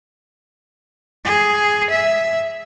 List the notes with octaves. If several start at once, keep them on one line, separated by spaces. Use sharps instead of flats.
G#4
E5